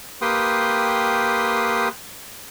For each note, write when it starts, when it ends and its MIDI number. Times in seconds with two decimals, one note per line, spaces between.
0.22 1.88 58
0.22 1.88 67
0.22 1.88 71
0.22 1.88 79
0.22 1.88 84
0.22 1.88 87